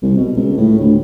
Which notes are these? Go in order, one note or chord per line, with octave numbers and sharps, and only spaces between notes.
C2
B2
C#2
A2
D2